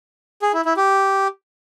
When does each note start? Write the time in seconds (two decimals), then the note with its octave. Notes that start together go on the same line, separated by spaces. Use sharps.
0.42 G#4
0.54 E4
0.65 E4
0.77 G4